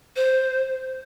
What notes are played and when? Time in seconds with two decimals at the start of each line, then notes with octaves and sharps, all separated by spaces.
0.16 C5